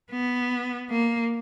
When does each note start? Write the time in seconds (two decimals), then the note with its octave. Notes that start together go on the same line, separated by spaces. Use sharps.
0.11 B3
0.90 A#3